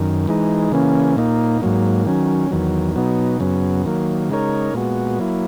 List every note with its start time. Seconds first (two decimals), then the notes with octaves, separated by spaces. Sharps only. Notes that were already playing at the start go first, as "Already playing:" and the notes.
Already playing: F#2 D#3
0.27 E3 G#3 D#4
0.72 C#3 E3 A#3 C#4
1.16 A#2 A#3 D#4
1.62 G#2 F#3 A#3
2.06 D#3 F#3 C#4
2.51 E2 D#3 F#3
2.96 B2 F#3 B3 D#4
3.40 F#2 C#3 F#3 B3
3.85 D#3 F#3 A#3
4.29 C#3 G#3 D#4 A#4 C#5
4.74 A#2 G#3 B3 F#4
5.19 F#3 A#3 E4